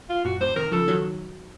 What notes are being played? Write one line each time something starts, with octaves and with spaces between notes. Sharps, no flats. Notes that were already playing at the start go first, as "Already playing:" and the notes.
F4
F#2 A#2 F#4
A2 C3 C5
C3 D#3 A#4
C#3 F3 A4
D#3 F#3